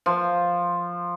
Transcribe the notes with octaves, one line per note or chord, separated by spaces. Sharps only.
F3